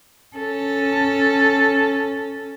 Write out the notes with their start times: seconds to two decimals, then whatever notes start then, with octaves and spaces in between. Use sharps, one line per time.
0.37 C#4 A4